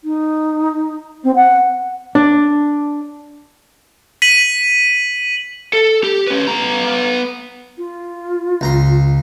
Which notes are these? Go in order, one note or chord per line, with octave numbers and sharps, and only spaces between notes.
D#4
C4
F#5
D4
B6 D#7 F#7
A4
G4
C#4 B4
B3 A#5
F4
C#2 A#5 C6